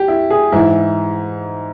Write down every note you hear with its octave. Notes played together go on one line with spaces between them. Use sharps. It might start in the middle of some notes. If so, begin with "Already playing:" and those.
Already playing: G4
E4
G#4
G#2 E3 E4